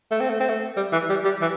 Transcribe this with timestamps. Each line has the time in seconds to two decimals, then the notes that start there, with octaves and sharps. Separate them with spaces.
0.11 A3
0.20 C4
0.30 A3
0.40 C4
0.49 A3
0.77 G3
0.92 E3
1.10 G3
1.25 G3
1.41 E3